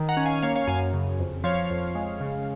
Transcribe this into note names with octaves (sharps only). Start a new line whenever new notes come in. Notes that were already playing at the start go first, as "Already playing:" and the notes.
Already playing: D#3
F#5 A#5
C#4
F5 G#5
A#3 C#5 F5
C#5 F5
F#2 F5 G#5
C#3
F2
F3 C#5 F5
F2
G#3
C#3